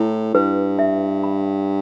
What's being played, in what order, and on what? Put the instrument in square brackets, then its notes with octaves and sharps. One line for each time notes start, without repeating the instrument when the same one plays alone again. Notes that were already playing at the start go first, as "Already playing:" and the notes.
Already playing: [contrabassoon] A2 [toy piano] E4
[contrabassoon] G2 [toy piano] B4
[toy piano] E5
B5